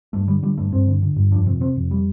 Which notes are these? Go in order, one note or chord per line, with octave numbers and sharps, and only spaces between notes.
G2 A3
D3 G3
D3 G3
G2 A3
G2 C4
D3
D3
G2
F2 D4
C3 C4
C3 C4
F2
G3